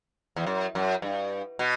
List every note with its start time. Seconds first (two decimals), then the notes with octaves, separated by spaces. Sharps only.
0.36 E2
0.46 F#2
0.75 F#2
1.02 G2
1.59 B2